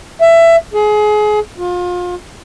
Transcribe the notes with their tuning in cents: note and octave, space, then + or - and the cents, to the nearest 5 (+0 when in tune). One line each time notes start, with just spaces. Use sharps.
E5 +15
G#4 +25
F4 +30